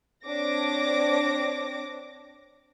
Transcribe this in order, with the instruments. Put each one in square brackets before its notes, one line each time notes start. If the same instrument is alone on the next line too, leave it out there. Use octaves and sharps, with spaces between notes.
[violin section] C4 D4 C#5 D6 A#6